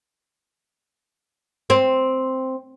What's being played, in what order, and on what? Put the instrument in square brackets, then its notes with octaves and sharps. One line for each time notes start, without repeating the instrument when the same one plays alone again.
[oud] C4